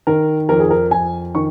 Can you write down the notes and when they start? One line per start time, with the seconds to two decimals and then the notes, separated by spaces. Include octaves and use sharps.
0.07 D#3 A#4
0.49 F2 A#4
0.60 G#4
0.71 A#4
0.91 F2 G#5
1.35 D#3 C#6